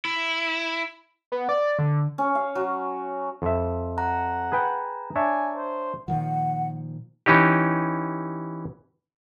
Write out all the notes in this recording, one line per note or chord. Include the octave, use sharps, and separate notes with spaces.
E4
B3
D5
D3
C#4
F5
F#3
F2 E5
F#5 A#5
G#4 B4 G5
D4 C#5 E5 G#5
C5
A#2 D#3 F3 F#5
E3 C#4 D#4 G4